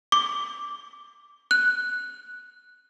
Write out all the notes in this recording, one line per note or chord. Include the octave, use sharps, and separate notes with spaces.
D6
F#6